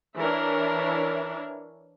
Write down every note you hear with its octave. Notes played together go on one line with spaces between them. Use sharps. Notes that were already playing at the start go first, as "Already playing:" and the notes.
E3 D4 E4 A#4 C#5